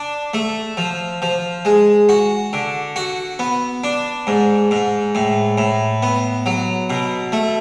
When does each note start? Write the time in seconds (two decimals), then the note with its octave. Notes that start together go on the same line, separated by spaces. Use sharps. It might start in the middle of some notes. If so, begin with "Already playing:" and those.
Already playing: D4
0.34 A3
0.77 F3
1.22 F3
1.65 G#3
2.09 F#4
2.53 D3
2.96 F#4
3.39 B3
3.84 D4
4.27 G#2
4.71 G#2
5.15 A2
5.58 A2
6.02 B3
6.46 F#3
6.90 B2
7.32 A3